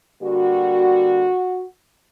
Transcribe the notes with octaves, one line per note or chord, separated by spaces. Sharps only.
D3 G3 A#3 F#4